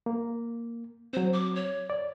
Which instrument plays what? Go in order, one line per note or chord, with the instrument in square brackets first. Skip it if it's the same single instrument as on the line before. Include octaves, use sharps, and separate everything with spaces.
[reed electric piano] A#3
[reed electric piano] F#3 C4 [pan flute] C5
[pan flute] D6
C#5
[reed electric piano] D5